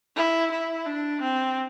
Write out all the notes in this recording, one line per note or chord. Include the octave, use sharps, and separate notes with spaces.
E4
E4
D4
C4